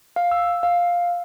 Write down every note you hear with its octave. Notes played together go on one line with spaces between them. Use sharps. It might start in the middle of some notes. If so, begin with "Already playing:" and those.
F5
E6
F5